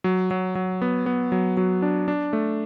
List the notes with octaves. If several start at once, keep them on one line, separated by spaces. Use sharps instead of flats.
F#3
F#3
F#3
B3
B3
F#3
F#3
D4
D4
A3